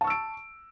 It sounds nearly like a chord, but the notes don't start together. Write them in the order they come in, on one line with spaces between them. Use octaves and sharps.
A5 C#6 E6 D7